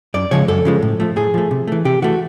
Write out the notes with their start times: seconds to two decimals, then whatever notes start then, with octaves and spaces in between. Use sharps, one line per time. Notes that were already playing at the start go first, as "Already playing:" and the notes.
0.14 F#2 D5
0.31 C#3 F3 G#3 C#5
0.48 F#2 A4
0.65 C#3 F3 G#3
0.82 A2
1.00 F3 A3
1.16 A2 G#4
1.34 F3 A3
1.51 C3
1.68 E3 A3
1.85 C3 G4
2.02 E3 A3 F#4